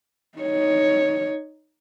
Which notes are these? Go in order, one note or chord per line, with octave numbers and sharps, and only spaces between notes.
D#4 C#5